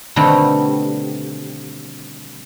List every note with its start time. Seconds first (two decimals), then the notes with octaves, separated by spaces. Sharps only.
0.16 B2 D3 D#3 G3 A3 C4